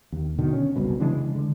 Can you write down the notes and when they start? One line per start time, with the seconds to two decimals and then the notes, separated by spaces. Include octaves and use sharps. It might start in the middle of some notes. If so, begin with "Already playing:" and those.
0.12 D#2
0.38 B2 D3 D#3
0.53 C#4
0.76 F#1 C2 B2
1.00 C#3 E3 G#3 D4
1.36 D3